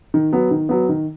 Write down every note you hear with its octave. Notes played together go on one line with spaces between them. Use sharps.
D#3
F#3 B3
D#3
F#3 B3
D#3